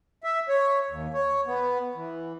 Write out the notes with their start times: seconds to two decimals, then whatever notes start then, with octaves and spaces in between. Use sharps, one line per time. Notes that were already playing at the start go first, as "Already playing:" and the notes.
0.24 E5
0.49 C#5
0.90 D#2
1.14 C#5
1.47 B3
1.95 E3